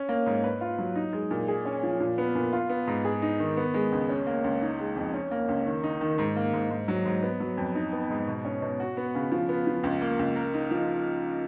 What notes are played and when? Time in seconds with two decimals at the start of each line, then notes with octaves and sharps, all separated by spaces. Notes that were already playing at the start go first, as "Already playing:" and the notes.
Already playing: C#4
0.09 A#3
0.26 G#2
0.44 B4
0.61 F4
0.78 F#3
0.96 D#4
1.13 G#3
1.31 A#2
1.48 G#4
1.65 C#4
1.83 F3
2.00 A#2
2.18 B3
2.35 A#2
2.53 F4
2.69 B3
2.87 G#2
3.05 G#4
3.22 D#4
3.40 D#3
3.57 B3
3.74 G#3
3.92 C#2
4.09 C#4
4.27 A#3
4.44 C#2
4.62 D#4
4.79 G#3
4.96 F2
5.14 C#4
5.31 A#3
5.49 C#2
5.66 D#3
5.84 D#4
6.01 D#3
6.18 G#2
6.36 A#3
6.53 G#2
6.70 G#2
6.88 F#3
7.06 G#2
7.23 B3
7.40 F#3
7.57 F2
7.75 D#4
7.92 B3
8.10 G#2
8.28 B2
8.45 C#4
8.62 B2
8.80 F#4
8.97 B3
9.15 C#3
9.32 F3
9.49 B3
9.67 F3
9.84 C#2
10.01 A#3
10.19 C#2
10.36 A#4
10.54 D#4
10.71 F3